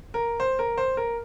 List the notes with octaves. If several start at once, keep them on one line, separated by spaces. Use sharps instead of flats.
A#4
C5
A#4
C5
A#4